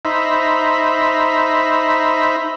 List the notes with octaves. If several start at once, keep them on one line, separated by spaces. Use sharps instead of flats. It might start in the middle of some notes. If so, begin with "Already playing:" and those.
D#4 C5 E5 A#5 B5